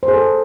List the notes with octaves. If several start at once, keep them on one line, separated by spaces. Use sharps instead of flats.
C5
G#4
A4